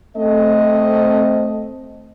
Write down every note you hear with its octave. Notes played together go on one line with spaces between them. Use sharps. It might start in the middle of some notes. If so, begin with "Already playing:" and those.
A3 C4 D#5